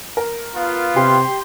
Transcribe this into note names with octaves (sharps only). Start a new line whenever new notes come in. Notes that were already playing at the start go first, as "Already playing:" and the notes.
A#4
B3 F4
C3 G4 C6